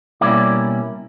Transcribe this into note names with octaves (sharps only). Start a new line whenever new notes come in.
B2 G3 A#3 C#4 E4 D5